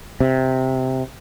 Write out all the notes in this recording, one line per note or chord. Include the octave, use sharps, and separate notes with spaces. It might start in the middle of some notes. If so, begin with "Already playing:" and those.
C3